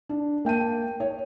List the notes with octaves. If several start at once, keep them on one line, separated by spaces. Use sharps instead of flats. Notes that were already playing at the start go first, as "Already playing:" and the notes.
D4
A#3 G5 A5 D#7
C#5